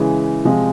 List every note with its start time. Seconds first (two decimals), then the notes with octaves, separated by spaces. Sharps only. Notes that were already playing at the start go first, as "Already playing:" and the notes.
Already playing: C#3 E3 G#3
0.44 C3 F3 G#3